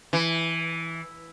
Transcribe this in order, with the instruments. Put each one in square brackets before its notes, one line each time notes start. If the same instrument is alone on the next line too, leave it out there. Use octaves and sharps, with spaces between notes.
[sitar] E3